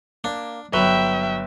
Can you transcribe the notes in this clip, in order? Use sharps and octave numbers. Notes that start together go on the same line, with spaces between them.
A#3 D4
G1 F#3 B4 E5 G5 G7